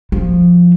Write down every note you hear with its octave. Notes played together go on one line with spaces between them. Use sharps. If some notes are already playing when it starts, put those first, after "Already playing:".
F3